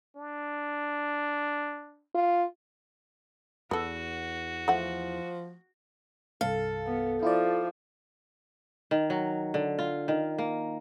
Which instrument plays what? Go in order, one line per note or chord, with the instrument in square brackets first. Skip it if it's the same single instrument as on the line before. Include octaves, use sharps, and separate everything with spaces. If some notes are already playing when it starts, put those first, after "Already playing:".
[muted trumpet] D4
[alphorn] F4
[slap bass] E2 [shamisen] B3 A4 [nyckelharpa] F#4
[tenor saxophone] F3 [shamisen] A3 F#5
[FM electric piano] C2 G2 F5 [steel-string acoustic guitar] A4
[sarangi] B3
[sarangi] F3 [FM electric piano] E4 F4 D5
[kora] D#3
F#3
D3
F4
D#3
A#3